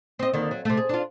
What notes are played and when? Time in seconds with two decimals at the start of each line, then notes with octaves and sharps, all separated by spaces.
0.19 C4 D#5
0.34 D#2 D3 D#3
0.51 F#3
0.65 C3 A3
0.77 G#4
0.89 D4 F4